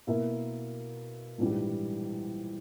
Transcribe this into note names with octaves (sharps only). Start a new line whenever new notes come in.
B2 A#3 E4 A#4 E5
A#1 G#2 E3 G3